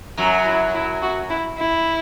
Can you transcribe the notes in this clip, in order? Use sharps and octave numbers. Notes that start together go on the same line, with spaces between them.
F#2 F#3 F#4
E4
E4
F#4
E4
E4